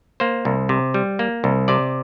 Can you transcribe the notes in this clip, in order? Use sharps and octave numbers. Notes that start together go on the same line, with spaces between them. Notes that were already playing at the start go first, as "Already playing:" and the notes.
A#3 C5
C2
C3
G3
A#3
C2
C3 D5